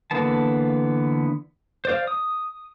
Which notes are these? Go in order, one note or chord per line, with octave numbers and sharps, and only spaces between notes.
D3 E3 A#3 B3 A5
C5 D5 F5
D#6